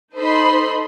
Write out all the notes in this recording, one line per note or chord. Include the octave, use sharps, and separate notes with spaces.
D#4 A4 C5 D#5 B5 C6